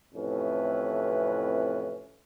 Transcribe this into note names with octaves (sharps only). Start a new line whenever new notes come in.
F2 A2 C3 E3 C#4 B4